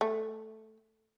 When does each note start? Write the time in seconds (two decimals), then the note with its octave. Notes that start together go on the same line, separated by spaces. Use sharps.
0.01 A3